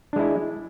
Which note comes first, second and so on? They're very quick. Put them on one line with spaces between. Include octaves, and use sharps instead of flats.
D4 G#3 E4